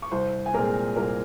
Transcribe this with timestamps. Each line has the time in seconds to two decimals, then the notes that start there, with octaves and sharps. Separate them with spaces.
0.02 C#6
0.11 C2 C5 C6
0.46 G#5
0.54 A#2 G#3 C4 A#4 A#5
0.96 C2 A#4 A#5